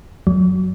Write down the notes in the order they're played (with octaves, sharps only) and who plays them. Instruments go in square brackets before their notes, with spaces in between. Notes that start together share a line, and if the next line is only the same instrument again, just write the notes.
[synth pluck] F#2 F#3